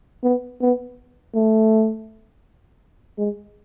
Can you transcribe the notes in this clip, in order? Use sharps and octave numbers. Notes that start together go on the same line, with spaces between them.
B3
B3
A3
G#3